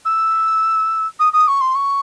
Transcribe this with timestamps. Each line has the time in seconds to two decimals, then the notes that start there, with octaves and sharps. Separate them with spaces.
0.05 E6
1.19 D#6
1.33 D#6
1.48 C#6
1.61 C6
1.75 C#6